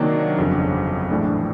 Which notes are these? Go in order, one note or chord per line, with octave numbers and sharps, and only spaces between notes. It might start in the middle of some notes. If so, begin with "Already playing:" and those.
Already playing: C3 D#3 F#3 A#3 D4
G1 F2 C#3 F#3
A#1 A2 E3 A3 D4